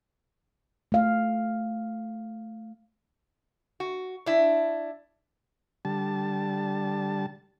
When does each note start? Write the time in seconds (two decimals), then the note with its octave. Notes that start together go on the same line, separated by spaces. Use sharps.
0.92 A3 F5
3.80 F#4
4.26 D4 E4
5.85 D3 G3 A5